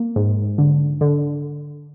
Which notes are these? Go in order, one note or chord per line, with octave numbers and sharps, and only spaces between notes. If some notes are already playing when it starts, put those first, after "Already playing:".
Already playing: A#3
G#2
D3
D3